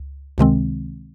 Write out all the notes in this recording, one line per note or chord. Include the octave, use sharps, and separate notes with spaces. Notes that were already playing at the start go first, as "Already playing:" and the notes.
Already playing: C#2
C#2 C3 D#3 G#3 C4